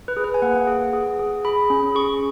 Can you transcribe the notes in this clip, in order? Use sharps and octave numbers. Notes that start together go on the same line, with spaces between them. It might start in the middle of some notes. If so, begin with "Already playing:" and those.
B4
G#4
B4
G#5
A#3 F#5
G#4
G#4
G#4
G#4 B5
C#4
G#4 C#6